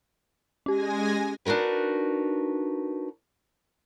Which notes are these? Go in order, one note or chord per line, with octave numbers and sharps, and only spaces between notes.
G#3 C#4 G4 G#5 A#6
D4 D#4 F#4 A#4 B4